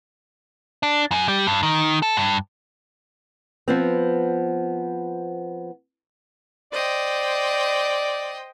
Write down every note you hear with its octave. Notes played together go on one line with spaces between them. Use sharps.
D4
F#2
G3
G2
D#3
A4
G2
F3 B3 C4
C5 D5 D#5 G5